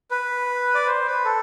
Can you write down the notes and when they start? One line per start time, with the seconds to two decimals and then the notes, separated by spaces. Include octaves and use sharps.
0.11 B4
0.74 D5
0.87 C5
1.07 B4
1.25 A4